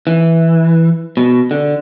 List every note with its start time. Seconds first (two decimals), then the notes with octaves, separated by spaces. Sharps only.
0.07 E3
1.17 B2
1.51 D3